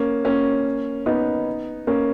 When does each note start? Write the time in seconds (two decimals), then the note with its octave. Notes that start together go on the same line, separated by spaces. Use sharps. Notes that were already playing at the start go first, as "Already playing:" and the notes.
Already playing: A#3 C#4
0.24 A#3 C#4
1.06 B3 D#4
1.87 A#3 C#4